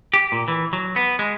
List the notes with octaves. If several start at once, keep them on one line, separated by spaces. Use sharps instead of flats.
G4
A#2
E3
F#3
B3
G#3